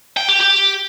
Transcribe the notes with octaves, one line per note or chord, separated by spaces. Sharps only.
G5
G4
G4